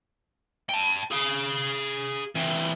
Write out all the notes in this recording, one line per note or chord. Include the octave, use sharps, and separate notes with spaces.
G5 A5
G#4 F5
E3 C4